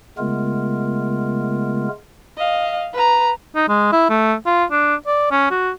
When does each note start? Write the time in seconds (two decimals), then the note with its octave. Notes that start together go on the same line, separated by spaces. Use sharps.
0.18 C#3 G#3 A3 B3 F4 A#4
2.37 D#5 F5
2.93 B4 A#5
3.55 D#4
3.69 G#3
3.92 E4
4.10 A3
4.46 F4
4.71 D4
5.07 D5
5.31 C#4
5.51 F#4